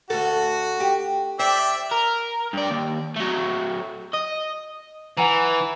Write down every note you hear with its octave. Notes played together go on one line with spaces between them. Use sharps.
D2 F#4 A4
G4
C5 D5 E5 G5
A#4
G2 D5
D#2
F#3 A3
D#5
E3 F#5 G#5 A#5